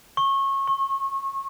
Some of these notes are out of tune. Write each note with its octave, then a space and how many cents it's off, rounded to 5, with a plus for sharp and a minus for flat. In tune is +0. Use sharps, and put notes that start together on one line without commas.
C#6 -25
C#6 -40